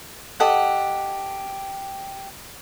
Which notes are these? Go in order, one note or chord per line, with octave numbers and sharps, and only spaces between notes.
G4 A4 D#5 F#5